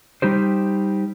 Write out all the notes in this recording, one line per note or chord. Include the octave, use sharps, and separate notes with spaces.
G3 D#4 G4 C5